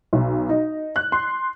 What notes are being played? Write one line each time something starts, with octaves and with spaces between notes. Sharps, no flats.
B1
D#4
F#6
C6